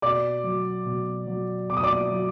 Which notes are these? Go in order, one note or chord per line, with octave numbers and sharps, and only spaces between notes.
B2 D5 D6
F#3
B2
F#3
B2 D6
D#6
D5 D6
F#3